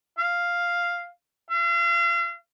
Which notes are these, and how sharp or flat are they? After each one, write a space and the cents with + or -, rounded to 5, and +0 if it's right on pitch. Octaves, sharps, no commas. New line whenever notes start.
F5 +0
F5 -40